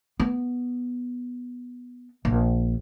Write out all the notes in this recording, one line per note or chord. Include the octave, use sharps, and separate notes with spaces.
B3
A#1